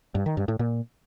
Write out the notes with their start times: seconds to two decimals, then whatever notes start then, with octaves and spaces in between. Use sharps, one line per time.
0.15 G2
0.26 D#3
0.37 G2
0.48 A2
0.59 A#2